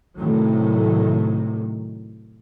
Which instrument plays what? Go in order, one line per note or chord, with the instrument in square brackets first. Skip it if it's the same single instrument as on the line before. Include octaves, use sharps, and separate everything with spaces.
[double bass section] A2 C3 D#3 F#3